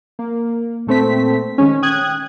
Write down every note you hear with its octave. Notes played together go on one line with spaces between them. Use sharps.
A#3
A#2 A3 C4 B6
D#3 G#3 C#4
G5 D#6 F#6 G#6